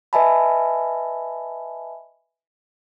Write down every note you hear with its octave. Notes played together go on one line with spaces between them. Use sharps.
B4 D#5 E5 G#5 A5 B5